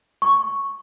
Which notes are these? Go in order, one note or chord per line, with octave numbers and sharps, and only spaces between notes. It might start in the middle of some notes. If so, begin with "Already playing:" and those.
C#6